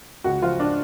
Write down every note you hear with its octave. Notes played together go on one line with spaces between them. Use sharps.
C#2 F#4
F3 F4
D4